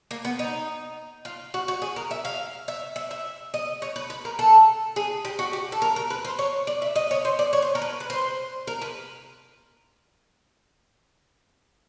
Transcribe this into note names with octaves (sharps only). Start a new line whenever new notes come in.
A#3
B3
D#4
F4
F#4
F#4
G#4
A#4
E5
F5
E5
E5
E5
D#5
C#5
B4
B4
A#4
A4
G#4
G4
F#4
G4
A4
A#4
A#4
B4
C5
C#5
D5
E5
D#5
C#5
C5
D5
C#5
C5
A#4
B4
B4
C5
A#4
B4